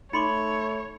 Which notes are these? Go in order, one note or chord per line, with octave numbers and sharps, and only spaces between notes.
A3 D#4 C#5 B5 C6 D6 C#7